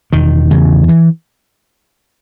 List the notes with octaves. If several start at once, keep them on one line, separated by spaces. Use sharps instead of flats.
E1 D#3
E2 C#3
E3